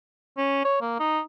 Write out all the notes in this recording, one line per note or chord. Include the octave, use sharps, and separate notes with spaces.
C#4
C#5
A#3
D#4